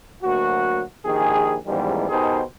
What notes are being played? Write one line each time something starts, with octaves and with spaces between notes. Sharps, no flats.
D2 F#3 A#3 F#4
A#1 D#3 G4 G#4
A1 E2 G#2 D#3 F3 G3
B2 D#4 G4 G#4 A#4 C5